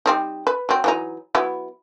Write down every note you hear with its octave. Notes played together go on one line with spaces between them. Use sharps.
G3 C4 D#4
B4
F#3 C4
E3 F#3 D#4
F#3 B3 E4